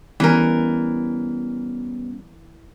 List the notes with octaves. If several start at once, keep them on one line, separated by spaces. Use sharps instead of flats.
E3 G3 B3 C#4 A#4